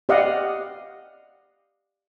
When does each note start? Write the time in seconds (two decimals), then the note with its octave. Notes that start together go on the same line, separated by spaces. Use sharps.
0.09 G4 D5 D#5 F5 F#5